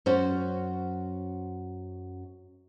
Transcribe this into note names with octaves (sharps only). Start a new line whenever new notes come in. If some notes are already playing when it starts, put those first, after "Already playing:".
F#2 C#4 F#4 C5